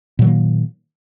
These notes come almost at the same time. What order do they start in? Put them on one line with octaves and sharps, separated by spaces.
A#2 F#3 D#3 A#3